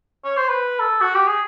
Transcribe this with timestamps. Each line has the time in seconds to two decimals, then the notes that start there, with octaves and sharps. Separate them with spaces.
0.25 C#5
0.37 C5
0.48 B4
0.80 A4
1.01 F#4
1.14 G4
1.28 G#4